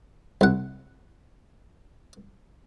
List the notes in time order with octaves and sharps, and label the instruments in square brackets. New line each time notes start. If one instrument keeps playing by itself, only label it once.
[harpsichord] C2 F#5